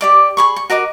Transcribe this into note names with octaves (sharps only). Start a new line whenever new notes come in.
G4 D5 D6
G#4 B5 C#6
C#6
F#4 A#4 D#5 D6